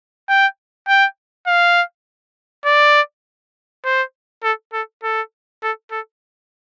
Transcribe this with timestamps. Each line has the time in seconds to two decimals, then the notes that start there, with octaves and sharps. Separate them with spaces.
0.29 G5
0.88 G5
1.47 F5
2.66 D5
3.85 C5
4.43 A4
4.73 A4
5.03 A4
5.63 A4
5.91 A4